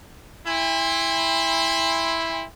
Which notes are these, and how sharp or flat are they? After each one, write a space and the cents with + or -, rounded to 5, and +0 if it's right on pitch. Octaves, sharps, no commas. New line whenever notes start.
E4 +0 G5 +45 C6 +0